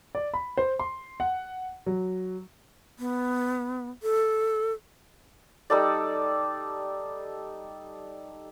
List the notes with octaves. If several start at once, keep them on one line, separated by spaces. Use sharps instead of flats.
D5
B5
C5
C6
F#5
F#3
B3
A4
G3 D#4 A4 D5